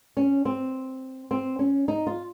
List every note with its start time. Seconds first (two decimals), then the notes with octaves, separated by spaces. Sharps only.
0.17 C#4
0.45 C4
1.31 C4
1.59 C#4
1.88 D#4
2.07 F4